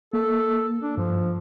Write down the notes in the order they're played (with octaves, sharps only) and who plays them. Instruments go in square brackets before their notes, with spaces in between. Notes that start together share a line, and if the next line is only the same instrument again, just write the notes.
[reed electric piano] A#3 [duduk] A4
[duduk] D4
[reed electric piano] G2 [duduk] F3